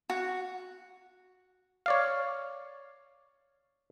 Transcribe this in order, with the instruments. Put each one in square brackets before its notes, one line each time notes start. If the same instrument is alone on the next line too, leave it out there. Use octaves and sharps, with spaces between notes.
[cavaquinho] F#4
[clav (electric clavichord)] C#5 D5 F5